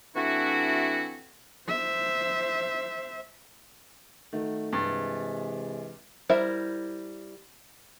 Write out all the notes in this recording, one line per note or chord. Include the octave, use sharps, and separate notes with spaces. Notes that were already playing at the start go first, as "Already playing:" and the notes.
E3 A3 C4 D4 E4 F#4
C5 E5
D#3 A3 F#4
G2 C3 E3 G#3 A6
G3 E4 A#4 C5 E5